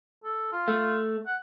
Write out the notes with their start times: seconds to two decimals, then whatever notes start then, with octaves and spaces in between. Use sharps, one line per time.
0.24 A4
0.52 F4
0.68 A3
1.27 F#5